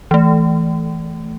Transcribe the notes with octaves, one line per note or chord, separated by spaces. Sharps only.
E3 A3